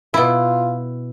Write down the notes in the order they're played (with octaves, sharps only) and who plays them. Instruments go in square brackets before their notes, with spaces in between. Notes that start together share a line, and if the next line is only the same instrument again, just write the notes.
[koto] B2 E4 [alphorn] F4